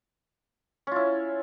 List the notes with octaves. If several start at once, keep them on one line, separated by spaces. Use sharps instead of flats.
C#4 E4 F4